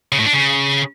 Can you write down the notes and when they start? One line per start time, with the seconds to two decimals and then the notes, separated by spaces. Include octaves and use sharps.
0.12 C#3
0.19 A2
0.26 D4
0.33 C#3